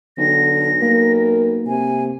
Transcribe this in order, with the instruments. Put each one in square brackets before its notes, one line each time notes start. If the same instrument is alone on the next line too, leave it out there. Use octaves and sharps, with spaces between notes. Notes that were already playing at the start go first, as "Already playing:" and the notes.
[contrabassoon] B1 [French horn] D3 [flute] A#6
[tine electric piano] A#3 [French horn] A#4
[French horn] C3 [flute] G#5